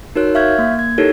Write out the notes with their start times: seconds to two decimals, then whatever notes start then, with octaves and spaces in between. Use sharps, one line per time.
0.15 D#4 F#4 A#4 C#5 F#6
0.35 E5 F5 C#6 F6 G6 G#6
0.59 A#3
0.79 G#6
0.98 D#4 E4 G4 A4 A#4 C#5